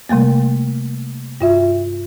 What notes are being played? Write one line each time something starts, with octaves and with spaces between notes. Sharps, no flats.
C3 G3 A3 A#3
G2 F4 E5